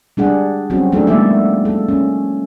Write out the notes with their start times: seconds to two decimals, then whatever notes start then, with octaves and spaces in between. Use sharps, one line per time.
0.17 G3 D4 G#4 F#5
0.70 F#3 G3 C4 C#4 F#4
0.92 F#3 A3 D4 D#4 G#4 A4
1.07 F#3 G#3 A#3 E4 D5 E5
1.65 A4
1.89 C#4